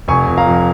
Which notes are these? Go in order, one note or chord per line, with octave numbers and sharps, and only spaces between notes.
F1 G#5 C#6
F1
F5 A#5
F2